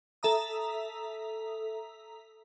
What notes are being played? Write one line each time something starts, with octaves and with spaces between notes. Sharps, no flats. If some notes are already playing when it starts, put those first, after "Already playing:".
A4 E5 A#5 D#6